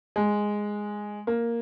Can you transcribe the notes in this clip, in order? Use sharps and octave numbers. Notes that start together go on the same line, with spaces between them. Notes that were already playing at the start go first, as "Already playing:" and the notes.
G#3
A#3